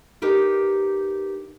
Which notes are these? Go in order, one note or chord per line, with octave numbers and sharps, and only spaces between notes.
D#4 G4 A#4 B4